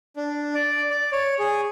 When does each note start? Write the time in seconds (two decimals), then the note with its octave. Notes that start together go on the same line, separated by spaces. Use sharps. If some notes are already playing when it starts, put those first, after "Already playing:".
0.16 D4
0.55 D5
0.90 D5
1.12 C#5
1.39 G#4